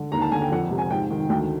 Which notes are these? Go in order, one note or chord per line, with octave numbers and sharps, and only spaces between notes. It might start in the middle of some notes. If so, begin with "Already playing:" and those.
Already playing: D3
D#2 A#5
A5
D3 G#5
G5
F2 F#5
C3
G#5
G#2 G5
D#3
D2 G5